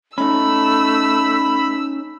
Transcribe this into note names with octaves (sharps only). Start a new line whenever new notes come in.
A3 C#4 D#4 B5 E6